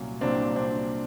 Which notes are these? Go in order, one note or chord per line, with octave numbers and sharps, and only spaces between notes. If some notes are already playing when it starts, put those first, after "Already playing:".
Already playing: C2 A#2 F#3 A#3 C#4
C2 A#2 F#3 A#3 C4 D4
C4 D4